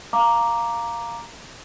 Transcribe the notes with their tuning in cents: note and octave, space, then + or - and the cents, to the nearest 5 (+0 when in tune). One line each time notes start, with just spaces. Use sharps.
F5 +0 A#5 +0 D6 +0